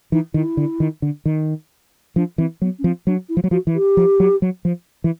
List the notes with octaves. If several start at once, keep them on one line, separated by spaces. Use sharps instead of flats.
E3 D#4
D#3 E4
D3
D#3
D3
D#3
F3 D4
E3 C4
F#3 B3
C#4
F3 C4
F#3 D4
E4
F3
F#3
F3 F#4
E3
G4
F3
F#3
F#3
F3
E3